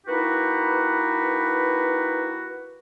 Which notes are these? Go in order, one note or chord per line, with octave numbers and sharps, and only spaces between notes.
A#3 D#4 E4 F#4 G4 B4